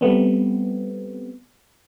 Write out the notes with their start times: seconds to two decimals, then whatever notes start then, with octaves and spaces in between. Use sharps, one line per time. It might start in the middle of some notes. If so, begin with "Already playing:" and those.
0.01 G3 A3 B3 C4